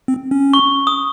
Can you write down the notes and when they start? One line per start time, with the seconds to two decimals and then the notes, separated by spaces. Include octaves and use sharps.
0.08 C4
0.31 C#4
0.54 C#6
0.87 D#6